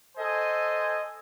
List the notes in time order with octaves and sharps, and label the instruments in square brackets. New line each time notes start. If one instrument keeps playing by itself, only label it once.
[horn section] A4 C5 D#5 G#5